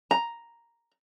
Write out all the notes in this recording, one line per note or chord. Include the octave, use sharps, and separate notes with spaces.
A#5